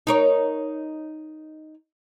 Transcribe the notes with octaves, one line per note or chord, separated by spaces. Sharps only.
D#4 A#4 C#5